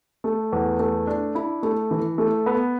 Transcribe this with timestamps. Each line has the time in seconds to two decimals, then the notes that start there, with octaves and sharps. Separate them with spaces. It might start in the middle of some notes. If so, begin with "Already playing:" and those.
0.24 A3
0.52 E2
0.79 A3
1.07 D4
1.35 E4
1.63 A3
1.91 E3
2.18 A3
2.46 B3